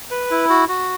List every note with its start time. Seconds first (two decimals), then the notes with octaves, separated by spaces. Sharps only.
0.11 B4
0.31 E4
0.50 F#4
0.69 F#4